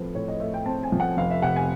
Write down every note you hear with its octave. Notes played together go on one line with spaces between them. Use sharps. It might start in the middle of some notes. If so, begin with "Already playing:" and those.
Already playing: A2 F3 A3 C4 A4 B4 C5
A2 C#5
D#5
A3 E5
G5
C4 A5
G#5
F3
F#5
F1 F5
E5
C3 F#5
G#5